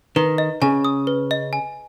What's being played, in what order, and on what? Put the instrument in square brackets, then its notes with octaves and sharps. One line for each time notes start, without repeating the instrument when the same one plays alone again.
[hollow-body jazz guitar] D#3 [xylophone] B4
[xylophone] D#5
[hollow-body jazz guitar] C#3 [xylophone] G#5
[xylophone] D#6
B4
D#5
G#5